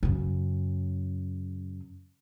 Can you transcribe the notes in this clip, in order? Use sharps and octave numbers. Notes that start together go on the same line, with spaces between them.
F#2 C#3